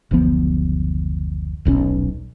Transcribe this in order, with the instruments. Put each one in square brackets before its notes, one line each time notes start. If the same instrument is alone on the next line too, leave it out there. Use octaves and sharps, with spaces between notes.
[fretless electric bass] F#1 D2 F3 B3
D#1 B1 C4 C#4